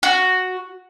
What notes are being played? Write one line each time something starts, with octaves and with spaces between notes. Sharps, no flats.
F#4